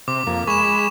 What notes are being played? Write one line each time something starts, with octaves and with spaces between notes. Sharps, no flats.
C3 D6
F2 A#3
G#3 B5 C#6 E7